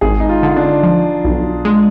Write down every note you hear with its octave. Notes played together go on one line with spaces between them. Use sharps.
G#1 G#4
D#4
F4
D3
D4
F3
B1
G#3